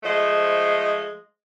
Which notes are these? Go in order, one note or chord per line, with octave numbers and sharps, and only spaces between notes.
F3 G#3 A3 C5 D#5